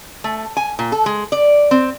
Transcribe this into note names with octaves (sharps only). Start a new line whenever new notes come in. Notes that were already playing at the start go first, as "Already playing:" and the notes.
A3
G#5
A#2
A4
G#3
D5
C4